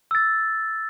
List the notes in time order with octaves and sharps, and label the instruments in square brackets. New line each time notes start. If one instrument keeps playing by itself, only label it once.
[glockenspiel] E6 A6